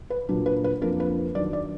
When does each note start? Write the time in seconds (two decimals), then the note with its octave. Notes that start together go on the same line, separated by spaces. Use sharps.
0.10 B4
0.29 A#2 F#3 D4
0.46 B4
0.64 B4
0.81 F2 F3 A#3 D4 A#4
1.00 B4
1.35 D#3 F#3 D4 D5
1.53 D5